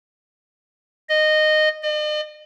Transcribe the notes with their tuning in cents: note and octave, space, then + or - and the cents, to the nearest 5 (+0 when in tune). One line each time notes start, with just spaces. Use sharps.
D#5 -15
D#5 -45